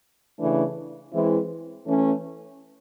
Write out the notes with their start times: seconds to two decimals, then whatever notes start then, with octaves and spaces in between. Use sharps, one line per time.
0.38 C#3 E3 A3 D4
1.12 E3 G#3 C4 E4
1.86 E3 A3 C#4